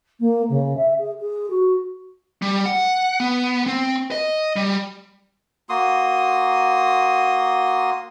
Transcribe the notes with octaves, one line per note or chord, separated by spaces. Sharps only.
A#3
C#3
E5
G#4
G#4
F#4
G3
F#5
B3
C4
D#5
G3
A#3 F#4 C6 D#6